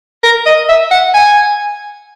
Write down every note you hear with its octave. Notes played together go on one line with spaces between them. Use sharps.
A#4
D#5
E5
F#5
G#5